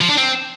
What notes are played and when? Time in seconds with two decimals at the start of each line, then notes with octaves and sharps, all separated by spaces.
0.01 F3
0.09 D4
0.18 C4